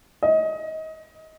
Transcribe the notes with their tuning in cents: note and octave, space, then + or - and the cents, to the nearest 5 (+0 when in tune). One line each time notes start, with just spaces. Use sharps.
D#5 +25